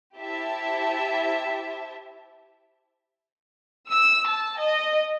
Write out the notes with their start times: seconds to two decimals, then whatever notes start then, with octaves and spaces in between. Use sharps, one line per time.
0.17 E4 G4 C5 E5 A5
3.90 E6
4.30 A5
4.61 D#5